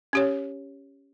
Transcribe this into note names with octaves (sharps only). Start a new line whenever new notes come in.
C#4 G4 C#5